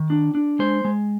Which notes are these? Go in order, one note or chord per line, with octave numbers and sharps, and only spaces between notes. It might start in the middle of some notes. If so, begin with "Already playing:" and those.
Already playing: D#3
D4
D4
G#3 C5
G#3